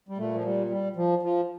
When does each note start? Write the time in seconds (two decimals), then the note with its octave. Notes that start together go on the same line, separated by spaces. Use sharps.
0.09 G3
0.18 A#2 A3
0.34 F3
0.44 G3
0.70 G3
0.96 F3
1.23 F3